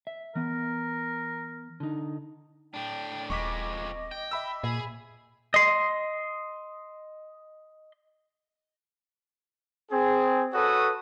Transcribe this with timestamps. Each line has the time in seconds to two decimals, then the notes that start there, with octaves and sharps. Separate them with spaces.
0.07 E5
0.35 E3 B3 A#4
1.80 D3 D#4
2.74 A2 D4 G5
3.30 D#1 F2 G#3 D#5 C#6 D6 B6
4.11 G5
4.31 E5 B5 E6
4.64 A#2 G#4
5.54 D#5 C6
9.92 C4 G#4
10.53 F#4 A4 B4 C#5 D#6